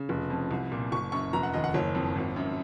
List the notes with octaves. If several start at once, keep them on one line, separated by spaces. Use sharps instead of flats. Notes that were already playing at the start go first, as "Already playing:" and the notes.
Already playing: C#3
F1
F2
C2
A#2
F#1 C#6
F#2 C#6
F1 A#5
F#5
D#2 D#5
F#5
F#1 C#5
F2
G#1
F#2